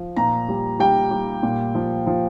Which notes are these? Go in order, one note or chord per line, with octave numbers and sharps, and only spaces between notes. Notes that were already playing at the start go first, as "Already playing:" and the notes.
Already playing: F3
A#2 A#5
G3
G3 G5
G3
A#2
F3
F3